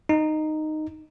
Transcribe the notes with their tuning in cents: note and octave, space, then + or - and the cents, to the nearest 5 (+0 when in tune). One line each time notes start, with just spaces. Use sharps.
D#4 -10